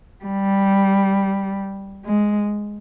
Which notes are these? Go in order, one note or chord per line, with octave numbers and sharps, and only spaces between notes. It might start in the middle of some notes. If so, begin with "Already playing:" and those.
G3
G#3